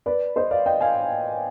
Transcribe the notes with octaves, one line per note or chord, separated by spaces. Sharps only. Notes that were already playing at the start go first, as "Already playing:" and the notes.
B4 D5
C5 D#5
D5 F5
D#5 G5
F5 G#5